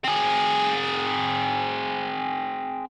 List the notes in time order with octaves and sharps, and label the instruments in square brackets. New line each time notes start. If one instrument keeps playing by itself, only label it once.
[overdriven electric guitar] C4 G#4